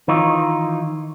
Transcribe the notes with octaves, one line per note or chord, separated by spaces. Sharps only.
D#3 E3 D#4 F4